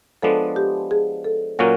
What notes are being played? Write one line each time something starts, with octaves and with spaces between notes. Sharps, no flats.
F3 G#3 B3 D4 A4
G4
G#4
A4
A#2 F#3 A#3 C#4 F#4 A#4